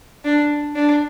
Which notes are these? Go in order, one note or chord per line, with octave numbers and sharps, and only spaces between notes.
D4
D4